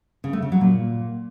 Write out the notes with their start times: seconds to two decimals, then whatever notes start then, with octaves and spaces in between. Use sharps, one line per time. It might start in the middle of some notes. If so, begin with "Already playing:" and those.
0.24 C#3
0.33 A3
0.42 C#3
0.52 F#3
0.61 A#2